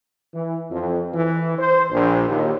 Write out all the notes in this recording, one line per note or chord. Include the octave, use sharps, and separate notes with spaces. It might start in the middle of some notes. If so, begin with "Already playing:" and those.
E3
F2
E3
C5
A#1
D#2